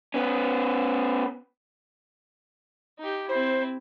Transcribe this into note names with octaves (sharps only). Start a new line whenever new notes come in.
B3 C#4
D#4 G4
C4 E4 C5